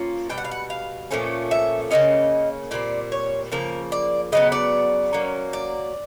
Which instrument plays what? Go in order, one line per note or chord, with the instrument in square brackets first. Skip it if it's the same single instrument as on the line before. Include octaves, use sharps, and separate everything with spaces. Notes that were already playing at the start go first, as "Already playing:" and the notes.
Already playing: [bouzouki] F3 A#3 C#4 F4
B2 G3 G5
F#5
F5
F#5
F5
A#2 F3 A3 C#4
E5
C#3 F#3 A#3 C#4 D#5
A#2 G3 C4 D5
C#5
C#3 F3 A#3 A#4
D5
C#3 F#3 B3 D#5
D5
F#3 A#3 C#4
D5